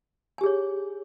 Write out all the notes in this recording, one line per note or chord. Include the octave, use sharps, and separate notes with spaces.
G4 G#4 C#5 G#5